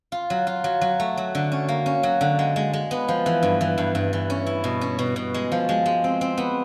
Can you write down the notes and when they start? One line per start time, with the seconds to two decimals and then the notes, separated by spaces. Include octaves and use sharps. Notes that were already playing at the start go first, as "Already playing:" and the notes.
0.12 F4
0.30 F#3
0.47 F4
0.64 F#3
0.81 F#3
1.00 A3
1.17 F#3
1.35 D3
1.52 C#4
1.69 A#3
1.86 C#4
2.03 F#3
2.21 D3
2.39 G#3
2.56 G#3
2.73 G#3
2.91 B3
3.08 F3
3.26 E3
3.43 G2
3.61 E3
3.78 G2
3.95 G2
4.13 E3
4.30 C#4
4.47 E4
4.64 B2
4.81 C#4
4.99 B2
5.16 B2
5.34 G#3
5.52 F3
5.69 G#3
5.86 G#3
6.04 C4
6.21 C4
6.38 B3